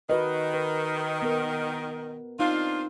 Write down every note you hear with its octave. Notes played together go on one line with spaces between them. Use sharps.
D#3 F#4 B4 D#5
B4
B3 A#4
C4 D4 D#4 F4